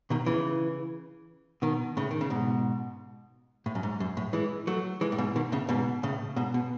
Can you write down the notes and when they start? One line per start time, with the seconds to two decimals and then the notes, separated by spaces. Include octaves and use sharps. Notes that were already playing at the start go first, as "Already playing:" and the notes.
0.10 B2 D#3
0.26 C#3 E3
1.62 B2 D#3
1.97 A2 C#3
2.11 D#3
2.21 C#3
2.30 G#2 B2
3.66 A2
3.75 F#2
3.83 G#2
4.00 F#2
4.17 A2
4.33 E3 G#3
4.67 F#3 A3
5.01 E3 G#3
5.12 A2
5.18 G#2 B2
5.36 B2 D#3
5.52 A2 C#3
5.69 G#2 B2
6.03 A2 C#3
6.36 G#2 B2
6.54 B2